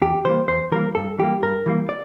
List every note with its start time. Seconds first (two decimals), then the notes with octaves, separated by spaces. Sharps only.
0.02 E2 G4
0.25 E3 G3 A#3 C5
0.48 E2 C5
0.72 E3 G3 A#3 A#4
0.95 G2 A4
1.18 E3 G3 A#3 G4
1.42 G2 A#4
1.66 E3 G3 A#3
1.89 D5